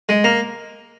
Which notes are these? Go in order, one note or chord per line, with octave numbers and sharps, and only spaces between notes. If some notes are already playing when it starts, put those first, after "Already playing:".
G#3
A#3